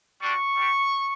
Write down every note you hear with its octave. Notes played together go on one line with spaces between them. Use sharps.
G3 D4 F#4 C#6
G3 D4 G4